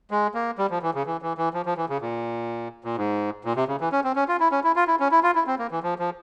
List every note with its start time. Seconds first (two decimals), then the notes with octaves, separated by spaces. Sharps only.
0.11 G#3
0.34 A#3
0.58 G3
0.70 F3
0.82 E3
0.94 C#3
1.06 E3
1.22 E3
1.38 E3
1.54 F3
1.66 F3
1.77 E3
1.89 C#3
2.01 A#2
2.84 A#2
2.97 G#2
3.45 A#2
3.56 C3
3.68 C#3
3.81 E3
3.92 C#4
4.04 C4
4.16 C#4
4.28 F4
4.40 E4
4.52 C#4
4.64 E4
4.76 F4
4.87 E4
5.00 C#4
5.11 E4
5.23 F4
5.35 E4
5.47 C4
5.59 A#3
5.71 E3
5.83 F3
5.99 F3